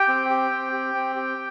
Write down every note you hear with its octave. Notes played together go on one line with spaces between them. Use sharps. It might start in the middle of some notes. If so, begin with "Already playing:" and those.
Already playing: G4 G5
C4
G4
C4
G4
C4
G4